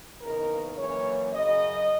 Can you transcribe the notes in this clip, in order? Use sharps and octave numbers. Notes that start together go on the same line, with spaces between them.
D#2 C#3 E3 B3 D#4 A#4
F#2 E3 A#3 C#4 C#5
F#2 C#3 F#3 D#5